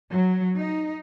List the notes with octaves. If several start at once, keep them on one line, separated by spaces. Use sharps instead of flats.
F#3
D#4